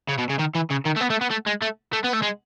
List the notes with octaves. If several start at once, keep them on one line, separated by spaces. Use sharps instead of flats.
C#3
B2
C#3
D#3
E3
C#3
D#3
A3
B3
A3
B3
A3
G#3
A3
A3
B3
A3
G#3